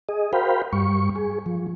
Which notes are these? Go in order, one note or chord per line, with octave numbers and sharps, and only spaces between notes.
G#4 D#5
F#4 A#4 C5 F5 G5 B5
G2 G3 C#6
G#4
F3